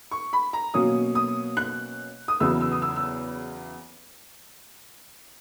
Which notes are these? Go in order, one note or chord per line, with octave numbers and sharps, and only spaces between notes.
C#6
B5
A#5
B2 F#3 A#3 C#4 D#6
D#6
F#6
D#6
E2 C#3 F#3 B3 E4 E6
E6
D#6
E6
E6